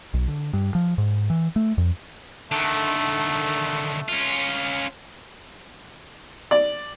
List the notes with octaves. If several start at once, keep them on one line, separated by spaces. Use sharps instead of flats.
B1
D3
G2
F3
G#2
E3
A3
F2
D3 D#3 A3
C#4 F4
D5